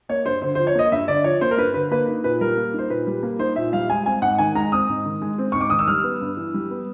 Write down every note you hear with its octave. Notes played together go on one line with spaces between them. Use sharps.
A#3 C#5
G2 C5
D3 C5
F3 C5
C#5
A#3 D#5
G2 E5
D3 D5
F3 C#5
A#3 C5
A#4
G2 B4
D3 B4
A#3 B4
D#4
A#2 B4
G3 A#4
A#3
D#4 C5
A#2 B4
G3
A#3
D#4 C5
A#2 E5
G3 F5
G#3 G#5
C4 G#5
G#2 F#5
D#3 G#5
G#3 A#5
C4 D#6
G#2
D#3
G#3
C4
G#2 C#6
D6
D#3 D#6
E6
G3 F6
B3
G2
E3
G3
B3